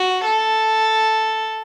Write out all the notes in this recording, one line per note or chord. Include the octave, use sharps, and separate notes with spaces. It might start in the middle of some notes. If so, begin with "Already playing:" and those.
Already playing: F#4
A4